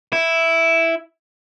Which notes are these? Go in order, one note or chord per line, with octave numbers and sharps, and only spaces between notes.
E4